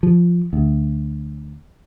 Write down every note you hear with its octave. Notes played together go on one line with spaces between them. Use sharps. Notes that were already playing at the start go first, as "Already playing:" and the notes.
F3
D2